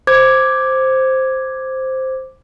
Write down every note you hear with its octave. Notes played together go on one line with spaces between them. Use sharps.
C5 D6 G#6